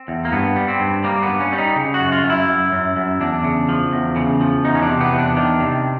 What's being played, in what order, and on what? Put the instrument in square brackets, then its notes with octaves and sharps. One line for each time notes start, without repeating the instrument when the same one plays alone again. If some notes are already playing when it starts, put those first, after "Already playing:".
Already playing: [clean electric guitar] C4
E2
A#3
G2 B3
G3
C4
G2
G3 A#3
B3
G2
C#4
G3
D#4
C#3
F#4
F#2
F4
F#2
E4
F#2
F#2
F#2
E2 D4
C#3
F3
E2
C#3
F3
E2 D#4
C#4
D4
C3
B3
E2
D4
D#3 D4
C3